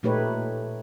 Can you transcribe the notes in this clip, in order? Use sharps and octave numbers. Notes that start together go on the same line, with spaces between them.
A#2 A3 D#4 G4 B4 C#5